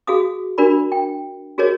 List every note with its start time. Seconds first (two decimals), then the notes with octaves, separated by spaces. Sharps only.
0.07 F#4 G#4 F5 D#6
0.58 D4 F#4 A#4 D5 B5
0.92 G5
1.58 F#4 G#4 A#4 C5 C#5 D#5